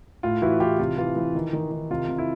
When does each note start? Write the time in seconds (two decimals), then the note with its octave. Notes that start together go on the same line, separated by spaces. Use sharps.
0.23 A2 F4
0.42 E3 E4 F#4
0.60 E3 F4 G4
0.79 C3 F4
0.98 E3 F4
1.16 E3
1.35 D#3
1.53 D#3
1.72 D#3
1.90 C3 F4
2.08 C3
2.18 E4